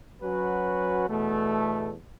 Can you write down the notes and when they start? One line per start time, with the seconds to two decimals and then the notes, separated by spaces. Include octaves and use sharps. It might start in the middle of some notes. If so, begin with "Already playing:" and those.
0.22 F#3 C#4 F#4 B4
1.08 E2 B2 A3